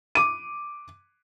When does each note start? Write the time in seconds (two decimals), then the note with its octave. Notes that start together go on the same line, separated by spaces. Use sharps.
0.15 D6 D#7